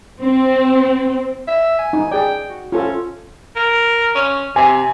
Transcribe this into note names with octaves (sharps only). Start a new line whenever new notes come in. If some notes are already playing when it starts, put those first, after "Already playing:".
C4
E5
G#5
D#4
G#4 D5 G5
F#4
C#4 F4 A4
A#4
C#4
C3 G#5